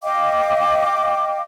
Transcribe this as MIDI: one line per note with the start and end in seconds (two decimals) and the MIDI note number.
0.04 1.42 75
0.04 1.42 77
0.04 1.42 79
0.04 1.42 86